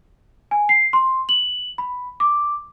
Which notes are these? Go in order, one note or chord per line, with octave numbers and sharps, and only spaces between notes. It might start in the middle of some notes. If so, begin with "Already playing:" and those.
G#5
C7
C6
F#7
B5
D6